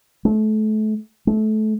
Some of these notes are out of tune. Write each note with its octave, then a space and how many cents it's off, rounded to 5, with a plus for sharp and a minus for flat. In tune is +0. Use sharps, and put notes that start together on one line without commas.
A3 -30
A3 -25